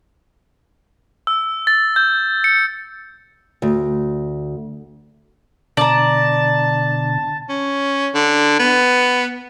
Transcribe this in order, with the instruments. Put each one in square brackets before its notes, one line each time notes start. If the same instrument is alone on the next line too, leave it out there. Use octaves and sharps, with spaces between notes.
[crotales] E6
A6
G6
C#7
[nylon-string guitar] D2
[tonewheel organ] B2 D3 [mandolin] D5 A#5 [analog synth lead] A5
[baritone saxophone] C#4
D3
B3